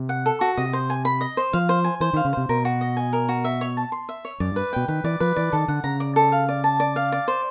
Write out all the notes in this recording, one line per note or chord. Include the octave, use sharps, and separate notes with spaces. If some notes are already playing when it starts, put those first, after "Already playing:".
Already playing: C3
F#5
A4
F#4
C3 D#5
C5
G#5
B5
D#5
C5
F3 F5
C5
G#5
E3 C5
D#3 F5
C#3
C3 C5
B2 A#4
F#4
D#5
G#5
A#4
F#4
E5
C#5
A5
C6
E5
C#5
F#2 D5
G2
B4
B2 G5
D#3 B4
E3 D5
F3 B4
E3 D5
D#3 A4
D3 F#5
C#3 A#5
D5
A4
F5
D5
A5
D5
F5
D5
C5